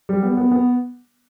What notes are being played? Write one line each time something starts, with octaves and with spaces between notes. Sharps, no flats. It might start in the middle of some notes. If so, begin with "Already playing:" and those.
G3
B3
B3
B3